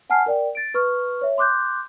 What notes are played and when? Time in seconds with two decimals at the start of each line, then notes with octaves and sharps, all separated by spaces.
0.10 F#5 G#5 A5 F6 C7
0.26 A#4 D5 G5
0.55 A6 D7
0.74 B4 C#6 F6
1.21 C#5 E5
1.38 C6 D6 F#6 G6